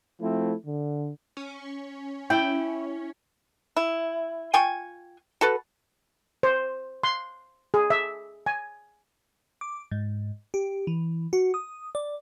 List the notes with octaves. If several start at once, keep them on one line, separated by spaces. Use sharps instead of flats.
F3 A3 C4 E4
D3
C#4
E4 G5
E4
F4 G5 G#5 C#6
F#4 A4 B4
C5
C6
G#4
E5
G#5
D6
G#2
G4
E3
F#4
D#6
D5